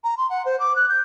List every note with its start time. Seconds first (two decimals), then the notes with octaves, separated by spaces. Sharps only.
0.04 A#5
0.17 C6
0.29 F#5
0.45 C5
0.59 D6
0.75 F#6
0.89 G6